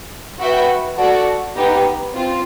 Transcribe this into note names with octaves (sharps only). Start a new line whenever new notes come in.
F#4 B4 E5 G5
F#4 A4 D5
B3 D#4 G4
C4 F4